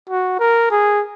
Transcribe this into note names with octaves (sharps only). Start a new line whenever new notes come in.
F#4
A#4
G#4